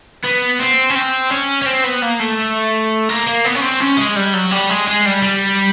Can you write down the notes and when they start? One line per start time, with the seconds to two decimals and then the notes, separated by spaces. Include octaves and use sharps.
0.24 B3
0.59 C4
0.90 C#4
0.96 C4
1.30 C#4
1.62 C#4
1.66 C4
1.84 B3
2.02 A#3
2.20 A3
3.09 A#3
3.27 A#3
3.45 B3
3.55 C#4
3.62 C4
3.80 C#4
3.98 G#3
4.16 G3
4.34 F#3
4.51 G3
4.70 G#3
4.88 G#3
5.06 G3
5.22 G3